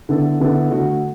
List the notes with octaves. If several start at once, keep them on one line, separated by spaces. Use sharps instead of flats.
D3 B3 E4 A4
D3 B3 E4 A4
D3 A3 F#4